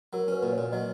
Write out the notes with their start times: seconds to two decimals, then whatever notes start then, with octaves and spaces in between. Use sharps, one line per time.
0.13 F#3 A#4
0.28 C#4 B4
0.43 A#2
0.52 C#5
0.58 A#2
0.72 F#3 D#5